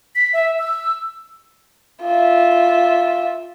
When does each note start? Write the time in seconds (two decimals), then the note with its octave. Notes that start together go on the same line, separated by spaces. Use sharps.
0.15 B6
0.33 E5
0.59 E6
2.03 F4 E5